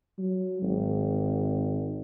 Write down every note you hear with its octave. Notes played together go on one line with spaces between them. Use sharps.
F#3
G#1